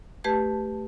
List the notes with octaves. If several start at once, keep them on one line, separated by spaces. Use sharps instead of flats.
A3 G4 B4 A5 G#6